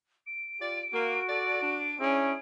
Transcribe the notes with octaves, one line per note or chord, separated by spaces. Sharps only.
D7
F4 G4 D5
A#3 F#4
A4 D5
D4
C#4 D4 E4 G#4